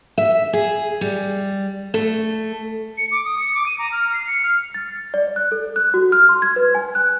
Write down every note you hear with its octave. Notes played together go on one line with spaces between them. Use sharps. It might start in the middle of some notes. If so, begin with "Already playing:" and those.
E5
G#4
G3
A3
C#7
D6
D#6
C#7
D6
D#7
A#5
F6
C7
C#7
F6
A6
D5
F#6
A4
F#6
F#4
F6
C6
G#6
B4
G#5
F#6